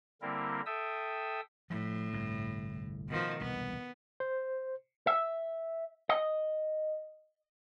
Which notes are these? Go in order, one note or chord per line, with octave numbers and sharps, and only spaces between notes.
D3 G3 A#3 C4 E4 A#4
A4 E5 G5 D#6 E6
A2 F3 G3 A3
G1 C2 G2
B2 D#3 F3
E1 C2 B3
C5
E5
D#5